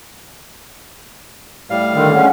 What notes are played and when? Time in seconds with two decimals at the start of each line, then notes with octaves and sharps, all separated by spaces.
1.70 A2 G3 F5
1.93 D3 D#3
2.13 G#3 C#4 F#5